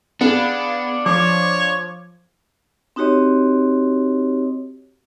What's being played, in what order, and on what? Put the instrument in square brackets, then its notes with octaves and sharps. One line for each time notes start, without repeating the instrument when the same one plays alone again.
[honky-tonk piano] B3 G#4 [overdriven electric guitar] D4 [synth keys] F5 C#7
[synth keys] F3 [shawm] C#5 [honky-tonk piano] D6
[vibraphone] C4 D#4 F#4 G4 C#5 D#5